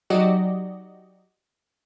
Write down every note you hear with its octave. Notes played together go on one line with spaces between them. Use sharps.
F#3 D#4 F#4 G4 D5 D#5